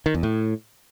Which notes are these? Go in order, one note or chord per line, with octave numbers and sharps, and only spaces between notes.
D#3
E2
A2